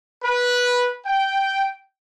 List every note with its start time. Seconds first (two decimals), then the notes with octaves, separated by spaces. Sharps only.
0.23 B4
1.06 G5